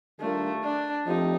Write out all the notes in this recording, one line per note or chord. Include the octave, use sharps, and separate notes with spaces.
D#3 G3 A3 D4 F4 A#4
D4
F3 A3 C4 D#4 G4